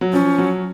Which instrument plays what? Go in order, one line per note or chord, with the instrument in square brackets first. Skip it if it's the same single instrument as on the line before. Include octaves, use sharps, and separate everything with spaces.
[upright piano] F#3
[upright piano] F3 [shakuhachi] C#4
[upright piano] F#3